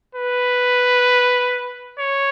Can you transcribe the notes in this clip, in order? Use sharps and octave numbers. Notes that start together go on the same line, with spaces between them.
B4
C#5